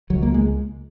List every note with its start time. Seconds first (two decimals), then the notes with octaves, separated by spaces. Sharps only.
0.10 C#2 F#3
0.23 A#3
0.34 G#3